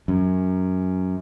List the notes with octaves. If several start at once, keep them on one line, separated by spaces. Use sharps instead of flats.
F#2